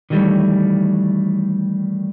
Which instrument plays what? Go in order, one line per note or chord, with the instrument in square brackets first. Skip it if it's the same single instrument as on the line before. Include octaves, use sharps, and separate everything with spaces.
[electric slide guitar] D#3 E3 F#3 G3 A3